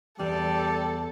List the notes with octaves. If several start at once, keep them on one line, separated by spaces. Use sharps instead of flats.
E2 G3 A4 D5